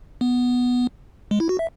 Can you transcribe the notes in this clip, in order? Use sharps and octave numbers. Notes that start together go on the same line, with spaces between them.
B3
G#3
E4
F#4
E5